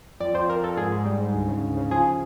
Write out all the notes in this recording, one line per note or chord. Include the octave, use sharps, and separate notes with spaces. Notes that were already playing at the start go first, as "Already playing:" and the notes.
F2 D5
F2 C5
F2 A#4
F2 A4
G#2 G#4
G#2
G3
G#2
D2
C#3
D2
C#3
F3 G#4